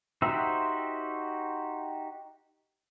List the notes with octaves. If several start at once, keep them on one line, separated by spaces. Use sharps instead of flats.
D#4 F#4 G4 C5 E5